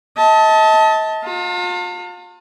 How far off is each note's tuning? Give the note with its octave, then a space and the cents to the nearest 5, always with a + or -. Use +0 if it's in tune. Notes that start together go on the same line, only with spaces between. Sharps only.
D#5 +40 A5 +0
F4 +35 A5 +45